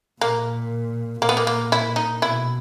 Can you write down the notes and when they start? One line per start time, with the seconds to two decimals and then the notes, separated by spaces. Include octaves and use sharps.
0.21 A#2 A#3
1.22 A#2 A#3
1.29 B3
1.37 A#3
1.47 A#3
1.72 E4
1.96 D#4
2.21 B2 E4